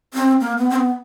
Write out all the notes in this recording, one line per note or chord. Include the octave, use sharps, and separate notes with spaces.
C4
A#3
B3
C4
B3